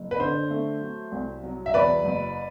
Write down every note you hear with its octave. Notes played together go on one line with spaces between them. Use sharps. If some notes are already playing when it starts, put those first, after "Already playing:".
Already playing: F#1
B4
D3 C5
A3
F#3
C2
F#3
E5
E2 B4 D5
F#1